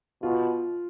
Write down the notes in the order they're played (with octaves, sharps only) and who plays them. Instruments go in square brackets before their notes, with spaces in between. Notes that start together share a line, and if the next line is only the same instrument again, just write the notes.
[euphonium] B2 [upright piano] F4